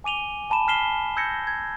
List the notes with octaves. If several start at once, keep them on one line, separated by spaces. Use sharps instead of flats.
G#5 D6 D#7 F7 G7
G#5 A5 B5 E7
A5 F6 B6 C7 E7 G7
E6 G6 G#6 A#6 C#7
G#6